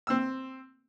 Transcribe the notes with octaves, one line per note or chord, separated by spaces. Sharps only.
C4 E6